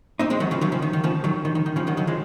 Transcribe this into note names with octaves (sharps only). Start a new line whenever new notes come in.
C4 D#4
G#3 C4
D#3 F#3
C#3 F3
D#3 F#3
C#3 F3
D#3
D#3
C#3 F3
D#3 F#3
D#3
D#3
D#3
C#3 F3
D#3 F#3
D#3 F#3
F3 G#3